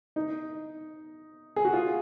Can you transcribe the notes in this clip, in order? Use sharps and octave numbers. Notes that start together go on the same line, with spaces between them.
D#4
G#4
F#4
F4